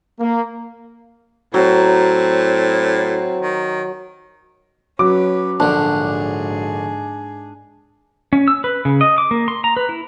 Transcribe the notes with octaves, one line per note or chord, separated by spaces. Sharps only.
A#3
A2 F#3 C4
D#3
F#3 C#4 B4 D6
A#1 G#2 D3 D4 G#4
C#4
E6
B4
C#3
D#5
D6
A#3
C6
A#5
B4
E4